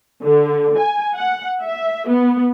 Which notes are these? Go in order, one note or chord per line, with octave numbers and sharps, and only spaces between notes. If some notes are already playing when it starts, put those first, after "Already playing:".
D3
G#5
F#5
E5
B3